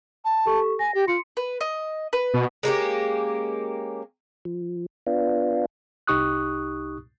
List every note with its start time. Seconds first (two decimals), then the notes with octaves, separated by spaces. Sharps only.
0.25 A5
0.46 G4 A4 C#6
0.79 G#5 A#6
0.94 G4
1.07 F4 C6 C#7
1.37 B4
1.61 D#5
2.13 B4
2.34 B2
2.63 G#3 A#3 C#4 G4
4.45 F3
5.07 B3 D4 F4
6.07 C2 D#4 G4 C#6 D#6 F#6